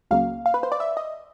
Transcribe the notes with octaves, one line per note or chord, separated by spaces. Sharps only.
C#2 C#3 F#3 A#3 F5
F5
B4
C5
D5
E5
D#5